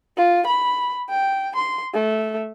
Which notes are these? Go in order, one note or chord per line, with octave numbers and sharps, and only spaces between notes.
F4
B5
G5
C6
A3